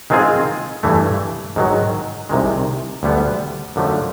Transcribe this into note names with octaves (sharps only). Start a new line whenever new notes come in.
D#3 G#3 C4 F4 G#4
G2 E3 A3
G#2 D#3 F#3
C2 C3 D#3 G#3
D2 D3 G3 B3
F#2 D3 F3 A3